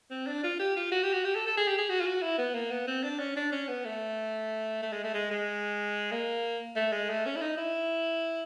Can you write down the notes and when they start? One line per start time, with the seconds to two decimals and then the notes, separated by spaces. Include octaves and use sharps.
0.11 C4
0.27 D4
0.44 F4
0.59 G4
0.76 F4
0.92 F#4
1.03 G4
1.13 F#4
1.25 G4
1.35 A4
1.47 A4
1.57 G#4
1.68 G4
1.78 G#4
1.89 F#4
2.01 F4
2.06 F#4
2.23 E4
2.38 B3
2.54 A#3
2.71 B3
2.87 C4
3.04 D4
3.19 C#4
3.36 D4
3.52 C#4
3.68 B3
3.85 A3
4.82 A3
4.92 G#3
5.04 A3
5.14 G#3
5.31 G#3
6.11 A#3
6.76 A3
6.92 G#3
7.10 A3
7.26 C#4
7.36 E4
7.41 D#4
7.57 E4